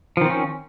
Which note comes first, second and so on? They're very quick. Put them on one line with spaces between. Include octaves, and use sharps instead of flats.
F3 D#3 C4 C#4